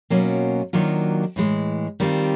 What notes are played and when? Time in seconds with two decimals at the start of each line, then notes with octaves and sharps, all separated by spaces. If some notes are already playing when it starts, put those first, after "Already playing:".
0.10 B2 F#3 A#3 C#4 F4
0.73 D#3 F#3 A#3 D4 F4
1.36 A2 E3 G#3
2.00 D#3 G3 C4 F4